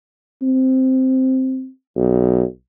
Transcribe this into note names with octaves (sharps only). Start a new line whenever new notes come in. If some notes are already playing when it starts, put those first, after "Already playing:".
C4
B1